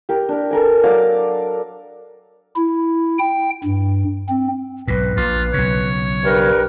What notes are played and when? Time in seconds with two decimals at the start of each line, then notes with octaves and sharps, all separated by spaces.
0.09 G4 A#4
0.29 D4 A#4
0.51 A4 A#4 G#5
0.83 F#3 D5 F5
2.56 E4
3.19 G5
3.64 G2
4.29 C4
4.88 B1 G#2 B4
5.17 A#1 F4
5.54 B1 C#3 C#5
6.23 G2 A#4 B4